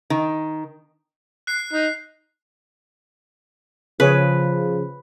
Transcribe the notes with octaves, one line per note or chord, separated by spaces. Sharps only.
D#3
F#6 C7
D#4
C#3 F3 C#4 G#4 B4 C#5